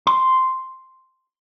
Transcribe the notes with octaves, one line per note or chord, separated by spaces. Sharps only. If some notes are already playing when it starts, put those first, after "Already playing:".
C6